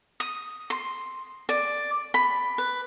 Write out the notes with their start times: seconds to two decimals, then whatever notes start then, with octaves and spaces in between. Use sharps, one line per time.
0.20 D#6
0.70 C6
1.49 D5
2.14 B5
2.58 B4